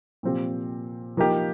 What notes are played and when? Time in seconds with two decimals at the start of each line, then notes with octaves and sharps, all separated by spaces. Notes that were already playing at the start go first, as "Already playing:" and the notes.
0.23 A#2 F3 C4 G4
1.17 F3 A#3 D#4 G4